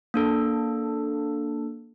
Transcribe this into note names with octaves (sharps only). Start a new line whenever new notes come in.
A#3 D4 A4